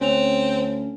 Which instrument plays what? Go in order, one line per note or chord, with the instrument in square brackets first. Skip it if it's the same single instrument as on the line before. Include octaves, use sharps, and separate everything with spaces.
[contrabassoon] D2 [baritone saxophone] C4 [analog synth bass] C#4 [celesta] C#5 F7